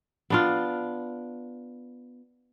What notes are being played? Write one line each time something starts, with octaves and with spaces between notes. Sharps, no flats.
B3 D4 F4